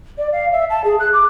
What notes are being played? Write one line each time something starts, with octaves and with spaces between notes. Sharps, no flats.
D5
F5
E5
A5
G#4
F#6
D6